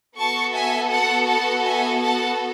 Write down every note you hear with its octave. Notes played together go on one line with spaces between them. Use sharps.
B3 F#4 A4 A5 C#6
E5 G#5
F#5 A5
F#5 A5
E5 G#5
F#5 A5